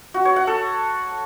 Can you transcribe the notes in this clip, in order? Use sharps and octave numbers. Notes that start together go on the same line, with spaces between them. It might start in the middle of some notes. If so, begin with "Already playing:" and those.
F#4
C#5
F#5
A4